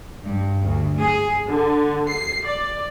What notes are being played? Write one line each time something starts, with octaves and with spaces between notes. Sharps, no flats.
G2
D2
G#4
D3
C7
D5